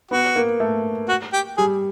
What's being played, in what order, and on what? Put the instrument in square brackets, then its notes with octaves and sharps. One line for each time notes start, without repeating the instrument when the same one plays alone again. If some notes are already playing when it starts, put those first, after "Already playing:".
[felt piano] B3 [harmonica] F#4
[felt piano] A#3
A3
[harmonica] F#4
G4
[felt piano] G3 [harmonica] G#4